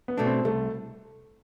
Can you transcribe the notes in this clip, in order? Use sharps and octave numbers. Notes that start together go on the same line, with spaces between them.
B3
B2 A3 D4
C4
C2 A3